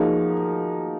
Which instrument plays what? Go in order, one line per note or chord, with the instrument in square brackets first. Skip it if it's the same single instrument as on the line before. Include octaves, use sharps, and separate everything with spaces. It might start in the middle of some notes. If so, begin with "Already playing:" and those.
Already playing: [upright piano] F3 A#3 D#4 F#4 [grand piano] G#4